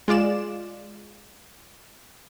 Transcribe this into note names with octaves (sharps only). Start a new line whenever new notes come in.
G#3 F4 D5 E7